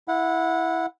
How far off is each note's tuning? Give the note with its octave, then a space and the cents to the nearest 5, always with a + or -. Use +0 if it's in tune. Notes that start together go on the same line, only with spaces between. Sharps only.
E4 +0 F#5 -20